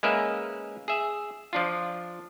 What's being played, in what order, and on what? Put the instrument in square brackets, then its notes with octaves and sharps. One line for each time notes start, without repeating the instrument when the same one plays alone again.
[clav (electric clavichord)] G#3 A#3 C#4 A#4 B4 E5
G#4 E5
F3 D4 F4